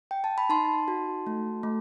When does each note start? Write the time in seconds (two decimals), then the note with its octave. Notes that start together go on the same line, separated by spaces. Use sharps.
0.11 G5
0.24 A5
0.38 B5
0.49 D#4 A5 C6
0.88 F#4
1.27 A3
1.63 A3